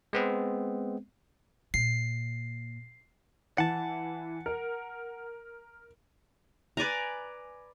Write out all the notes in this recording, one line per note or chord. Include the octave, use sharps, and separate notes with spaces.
G#3 B3 C4
A#2 C7
E3 F#5 A5
A#4
B4 D5 G#5 A#5